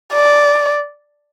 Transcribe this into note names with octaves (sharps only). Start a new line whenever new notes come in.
D5